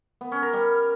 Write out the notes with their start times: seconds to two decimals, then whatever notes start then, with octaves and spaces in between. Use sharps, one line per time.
0.21 B3
0.32 C#4
0.42 A#4
0.53 G3